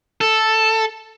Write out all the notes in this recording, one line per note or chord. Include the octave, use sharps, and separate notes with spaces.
A4